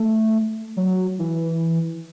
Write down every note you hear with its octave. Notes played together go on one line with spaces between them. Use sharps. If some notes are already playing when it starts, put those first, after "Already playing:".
Already playing: A3
F#3
E3